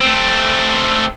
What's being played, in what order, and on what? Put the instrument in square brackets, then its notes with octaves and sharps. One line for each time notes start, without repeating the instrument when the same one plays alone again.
[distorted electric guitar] A3 C4